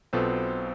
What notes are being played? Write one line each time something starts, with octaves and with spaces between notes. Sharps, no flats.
B1 B2 B3 C4 F4 A4